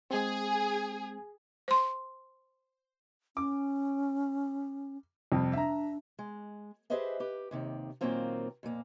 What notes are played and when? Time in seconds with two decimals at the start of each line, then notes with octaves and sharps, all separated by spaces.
0.11 G#3 C4 G#4
1.68 C5 C6
3.37 C#4 D6
5.32 F2 C3 G3
5.53 D4 E5 A#5
6.19 G#3
6.90 G4 G#4 B4 C5 D#5 E5
7.20 G4 B4
7.51 D#2 C3 D#3
8.01 A#2 D#3 F#3 A#3 C4 F4
8.63 F2 A#2 A#3